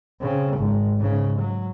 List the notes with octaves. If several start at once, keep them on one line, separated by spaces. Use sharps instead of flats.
C#3 C4
G#1 G#2
G#2 C#3
F#3